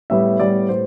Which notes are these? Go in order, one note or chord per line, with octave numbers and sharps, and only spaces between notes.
A2 G3 B3 E5
A2 G3 B3 D5
A2 G3 B3 C5